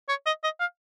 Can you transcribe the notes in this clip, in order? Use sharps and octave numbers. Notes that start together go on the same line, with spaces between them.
C#5
D#5
D#5
F5